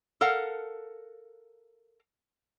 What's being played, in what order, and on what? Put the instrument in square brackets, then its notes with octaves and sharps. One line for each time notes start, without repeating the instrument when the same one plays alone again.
[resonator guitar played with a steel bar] A4 A#4 F5 F#5